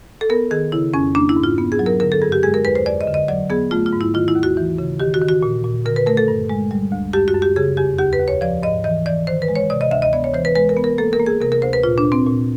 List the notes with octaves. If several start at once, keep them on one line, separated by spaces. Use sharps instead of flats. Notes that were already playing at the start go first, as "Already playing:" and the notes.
A4
B3 A#4
D#3 G#4
C#3 E4
F2 C#4
A#3 D4
E4
G#2
F4
B3
G#4
F#3
A#4
D3 A#4
A4
G2 G#4
G4
G#3 G#4
A#4
E2 B4
C5
F2 D5
D#5
D3
D#5
F#3 D5
B3 G#4
A3 F4
F4
G#2
E4
D#3 F4
E4
D#2
F#4
E3
C#3
D#3 G4
F#4
D#3
F#4
A#2
A#2
D3 A#4
B4
A3 A#4
A4
G2
G#3
G3
D2
F#2 G4
F#4
F#2
G4
C#3 G#4
F2 G4
D#2 G4
B4
D#2
C#5
F3 D5
G#2 D#5
E3 D#5
E3 D5
D#3 C5
B4
G#3
C#5
C3 D5
D#5
D2 E5
D#5
B3 D5
C#5
E3 C5
B4
G#3 B4
A#4
B3
A#4
A#3 A4
A#4
A#3
G#4
C3 A#4
A#4
D2 C5
B4
A#2 F4
D4
A#2
C4
A#2